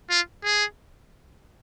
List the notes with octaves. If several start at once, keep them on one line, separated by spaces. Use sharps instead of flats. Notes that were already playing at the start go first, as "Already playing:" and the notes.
F4
G#4